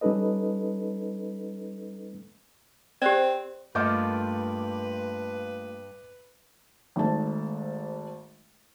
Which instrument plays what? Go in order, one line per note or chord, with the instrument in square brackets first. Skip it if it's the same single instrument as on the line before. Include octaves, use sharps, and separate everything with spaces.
[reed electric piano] G3 C#4 D#4 A4 B4 D#5
[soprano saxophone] C4 [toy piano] G4 C5 D5
[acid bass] G2 [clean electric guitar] A3 A#3 F4 [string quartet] B4 [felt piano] D#5 D6 G6
[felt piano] G#1 G#2 A3 A5